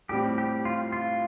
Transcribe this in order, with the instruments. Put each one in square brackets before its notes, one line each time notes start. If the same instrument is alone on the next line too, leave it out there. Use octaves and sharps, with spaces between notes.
[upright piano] A2 G3 C4 [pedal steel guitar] G4
[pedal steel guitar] G4
F4
F4